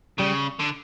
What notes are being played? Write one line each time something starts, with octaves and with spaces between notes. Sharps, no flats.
C#3 G3
D3